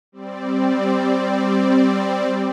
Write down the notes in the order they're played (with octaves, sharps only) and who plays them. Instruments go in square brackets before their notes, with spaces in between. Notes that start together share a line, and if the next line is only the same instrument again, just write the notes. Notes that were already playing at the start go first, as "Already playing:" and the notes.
[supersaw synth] G3 C4 D5